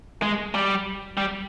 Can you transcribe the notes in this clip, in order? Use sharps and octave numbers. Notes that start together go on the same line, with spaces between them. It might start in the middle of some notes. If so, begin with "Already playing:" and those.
G#3
G3
G3